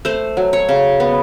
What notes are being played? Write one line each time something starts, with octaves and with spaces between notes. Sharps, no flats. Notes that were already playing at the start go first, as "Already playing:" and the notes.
A3 C5
F#3
C#5
C#3
B3